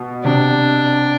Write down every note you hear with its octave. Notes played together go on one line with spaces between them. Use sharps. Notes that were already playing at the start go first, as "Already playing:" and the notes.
Already playing: B2
C3 D4